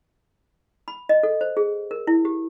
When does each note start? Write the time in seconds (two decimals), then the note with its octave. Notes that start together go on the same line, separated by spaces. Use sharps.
0.88 B5
1.09 D#5
1.23 A4
1.41 C5
1.57 G#4
1.91 A#4
2.07 E4
2.25 G4